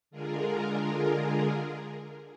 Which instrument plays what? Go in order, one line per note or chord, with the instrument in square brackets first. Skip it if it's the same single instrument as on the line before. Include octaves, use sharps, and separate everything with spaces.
[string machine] D3 G#3 F4 G#4 A#4